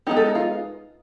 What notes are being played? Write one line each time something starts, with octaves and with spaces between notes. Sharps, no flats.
G#3 B3 D#4 G4
A4
A#4
F4